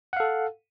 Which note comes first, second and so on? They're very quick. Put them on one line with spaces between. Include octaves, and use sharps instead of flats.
F#5 F5 A4